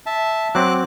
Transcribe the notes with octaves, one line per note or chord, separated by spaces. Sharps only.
E5 A5
F#3 C4 D6 F#6